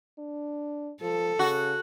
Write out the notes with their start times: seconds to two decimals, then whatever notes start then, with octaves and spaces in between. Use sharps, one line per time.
0.19 D4
1.02 F3 A4
1.39 C#3 F#4